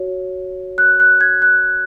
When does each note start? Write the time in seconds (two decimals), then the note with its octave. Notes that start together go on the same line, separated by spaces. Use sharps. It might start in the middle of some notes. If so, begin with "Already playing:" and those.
Already playing: F#4 C#5
0.78 F#6
1.00 F#6
1.21 G#6
1.42 F#6